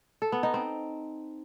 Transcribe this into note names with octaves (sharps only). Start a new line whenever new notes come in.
A4
B3
D#4
C4